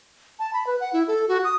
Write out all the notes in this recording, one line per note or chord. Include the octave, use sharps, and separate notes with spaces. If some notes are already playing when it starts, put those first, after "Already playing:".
A5
B5
B4
F#5
E4
A4
F#4
D#6